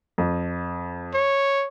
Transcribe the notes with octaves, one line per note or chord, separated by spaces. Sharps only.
F2
C#5